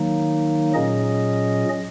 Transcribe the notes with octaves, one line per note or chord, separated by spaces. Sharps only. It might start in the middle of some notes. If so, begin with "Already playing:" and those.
Already playing: D#3 F#3 A#3 D#4
A#2 F#3 C#4 G#4 D#5